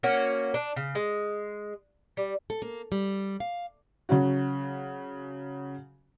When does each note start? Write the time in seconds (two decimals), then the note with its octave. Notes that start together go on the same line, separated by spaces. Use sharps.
0.03 A#3 C#4 F#4
0.54 D4
0.76 C#3
0.95 G#3
2.17 G3
2.50 A4
2.62 A#3
2.92 G3
3.40 F5
4.09 C#3 F#3 C#4 F#4